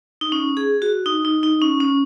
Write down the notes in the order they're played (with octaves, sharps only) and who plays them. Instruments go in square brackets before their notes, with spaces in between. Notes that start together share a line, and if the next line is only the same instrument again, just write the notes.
[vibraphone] D#4
C#4
G#4
F#4
D#4
D#4
D#4
C#4
C#4